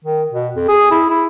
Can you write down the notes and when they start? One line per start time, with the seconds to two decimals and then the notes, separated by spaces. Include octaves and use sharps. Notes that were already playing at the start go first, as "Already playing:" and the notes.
0.04 D#3
0.33 B2
0.56 F2
0.68 G#4
0.91 E4
1.10 E4